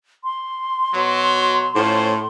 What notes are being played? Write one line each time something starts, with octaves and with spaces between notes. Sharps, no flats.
C6
B2 F#3
A2 C#4 F4 C5